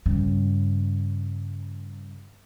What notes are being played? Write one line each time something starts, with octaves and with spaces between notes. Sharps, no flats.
G2 C#3